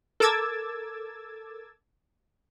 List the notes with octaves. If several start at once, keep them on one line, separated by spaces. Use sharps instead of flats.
A4 A#4 D6 E6 G#6 A6